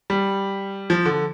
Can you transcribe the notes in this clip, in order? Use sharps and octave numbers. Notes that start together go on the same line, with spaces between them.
G3
F3
D3